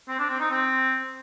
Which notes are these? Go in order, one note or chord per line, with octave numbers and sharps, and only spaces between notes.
C4
D4
C4
D#4
C4